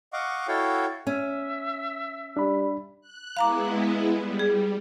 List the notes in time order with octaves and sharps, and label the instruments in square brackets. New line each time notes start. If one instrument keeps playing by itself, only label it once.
[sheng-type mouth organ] D#5 F5 F#5 C#6 D6
E4 F#4 A4 C#5 F5 G5
[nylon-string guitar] C#4 [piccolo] E5
[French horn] G3 [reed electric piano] D4 B5
[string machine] F#6
[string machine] G#3 B3 E4 [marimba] F5 A#5 D6
[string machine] G3
[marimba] G#4